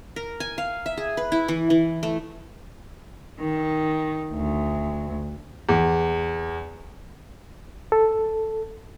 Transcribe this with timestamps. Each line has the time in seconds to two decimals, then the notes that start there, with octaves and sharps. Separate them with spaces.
0.16 A#4
0.40 G#5
0.58 F5
0.86 E5
0.97 G#4
1.17 B4
1.32 E4
1.48 E3
1.70 E3
2.03 A3
3.40 D#3
4.33 D2
5.69 E2
7.92 A4